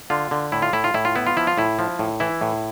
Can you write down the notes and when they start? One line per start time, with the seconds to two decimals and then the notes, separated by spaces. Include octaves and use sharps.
0.10 D3 F4
0.31 D3
0.52 A2 E4
0.62 F4
0.73 A2 E4
0.84 F4
0.94 A2 E4
1.05 F4
1.16 B3 E4
1.27 F4
1.37 F3 E4
1.47 F4
1.58 A2 E4
1.79 F3
1.99 A2
2.20 E3 E4
2.41 A2